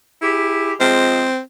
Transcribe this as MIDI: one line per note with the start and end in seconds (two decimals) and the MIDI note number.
0.22 0.72 64
0.22 0.72 67
0.22 0.72 68
0.80 1.26 53
0.80 1.26 56
0.80 1.39 60